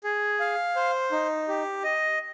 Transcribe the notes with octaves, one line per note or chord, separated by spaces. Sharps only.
G#4
F5
C5
D#4
G4
D#5